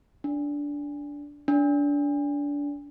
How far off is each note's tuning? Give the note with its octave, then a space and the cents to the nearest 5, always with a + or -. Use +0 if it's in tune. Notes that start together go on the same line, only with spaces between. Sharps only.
D4 -15
D4 -25